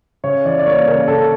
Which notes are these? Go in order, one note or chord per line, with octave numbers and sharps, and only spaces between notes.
C#3 C#5
E3 D5
D5
A#3 C#5
C#3 A#4
C#3 A4